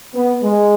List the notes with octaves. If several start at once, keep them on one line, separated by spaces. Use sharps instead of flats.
B3
G#3